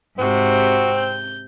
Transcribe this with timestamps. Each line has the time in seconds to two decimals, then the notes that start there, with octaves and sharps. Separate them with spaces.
0.18 G#2 C3 C4 F#4
0.96 G6